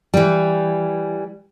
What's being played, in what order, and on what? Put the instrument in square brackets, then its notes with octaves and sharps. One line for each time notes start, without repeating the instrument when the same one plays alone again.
[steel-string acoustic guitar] E3 G3